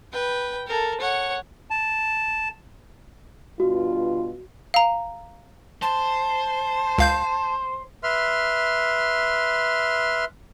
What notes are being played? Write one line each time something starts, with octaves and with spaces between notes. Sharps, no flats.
B4 G5
A4 A#4
C#5 F#5
A5
G2 B2 F4 F#4
F5 A#5
C5 A5
C#2 F5 G6
B4 E5 C6 F6